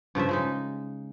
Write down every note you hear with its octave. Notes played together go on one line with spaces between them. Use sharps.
G2 C#3 F3 E5
C#3 G#3 D#4